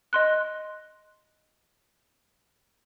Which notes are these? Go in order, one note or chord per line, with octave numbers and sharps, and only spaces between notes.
D#5 C6 F#6